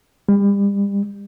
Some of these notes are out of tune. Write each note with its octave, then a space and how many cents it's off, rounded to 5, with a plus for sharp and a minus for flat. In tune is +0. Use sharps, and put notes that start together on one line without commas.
G3 +35